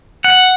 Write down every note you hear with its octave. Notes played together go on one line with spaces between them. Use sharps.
F#5